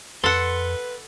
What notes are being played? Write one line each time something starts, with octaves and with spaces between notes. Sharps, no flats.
F2 A4 B4 F#5 C6